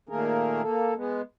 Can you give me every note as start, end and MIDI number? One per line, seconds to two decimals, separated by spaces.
0.09 0.62 46
0.09 0.62 51
0.09 0.62 57
0.09 0.62 58
0.09 0.62 68
0.09 0.62 70
0.62 0.94 58
0.62 0.94 69
0.96 1.22 56
0.96 1.22 59